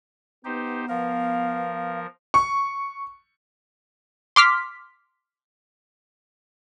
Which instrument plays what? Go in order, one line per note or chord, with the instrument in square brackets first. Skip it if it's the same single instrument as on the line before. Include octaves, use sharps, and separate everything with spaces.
[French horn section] B3 [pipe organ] D#4 G4 C5
[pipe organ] F3 A#4 [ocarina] F5
[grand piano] C#6
[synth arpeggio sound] C6 D6 F6 B6